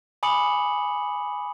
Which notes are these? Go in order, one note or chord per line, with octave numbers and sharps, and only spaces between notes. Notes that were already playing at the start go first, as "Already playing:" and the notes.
G#5 B5 D6 D#6 C#7 F#7